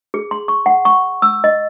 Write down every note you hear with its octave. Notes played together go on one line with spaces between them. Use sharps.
G#4
C6
C#6
F#5
C#6
E6
D#5